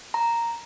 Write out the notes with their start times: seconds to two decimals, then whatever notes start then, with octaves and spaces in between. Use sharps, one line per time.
0.14 A#5